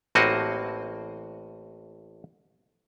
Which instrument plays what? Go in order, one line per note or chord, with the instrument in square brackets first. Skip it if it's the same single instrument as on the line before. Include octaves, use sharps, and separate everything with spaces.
[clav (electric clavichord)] A1 A2 A#3 C4 F#4 D#5